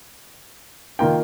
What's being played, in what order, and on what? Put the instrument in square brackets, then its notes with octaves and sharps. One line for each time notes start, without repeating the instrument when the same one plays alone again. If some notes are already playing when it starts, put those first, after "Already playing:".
[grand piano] D#3 A#3 F4 G5